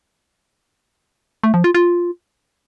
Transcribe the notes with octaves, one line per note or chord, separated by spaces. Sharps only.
A3
F3
F4
F4